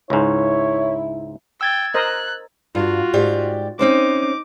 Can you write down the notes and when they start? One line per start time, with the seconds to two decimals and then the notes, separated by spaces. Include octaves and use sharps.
0.10 C#2 G#2 E4 C#5
1.61 G5 E6 G#6 A6
1.94 A#4 C5 D#5 F#6
2.75 G2 F4 F#4
3.13 G#2 G4 D5
3.79 C4 C#4 D#4 C5 D6